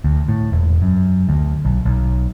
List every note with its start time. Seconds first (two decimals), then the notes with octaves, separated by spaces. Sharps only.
0.04 D2
0.28 A2
0.52 E1
0.82 F#2
1.29 D2
1.65 B1
1.85 B1